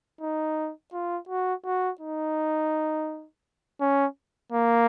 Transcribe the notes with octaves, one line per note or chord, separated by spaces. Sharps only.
D#4
F4
F#4
F#4
D#4
C#4
A#3